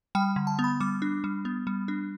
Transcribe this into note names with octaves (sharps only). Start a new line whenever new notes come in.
G3 G5
D3
A5
B3
B5
G3 D6
D4
G3
B3
G3
D4